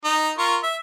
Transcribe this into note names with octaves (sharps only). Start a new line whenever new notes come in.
D#4
F4 A#4 C#6
E5